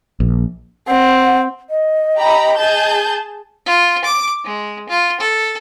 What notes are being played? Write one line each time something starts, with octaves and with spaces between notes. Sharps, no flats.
A#1
C4 F#5
D#5
G4 A#5 B5
G#4 A5 G6
F4
D6
G#3
F4
A4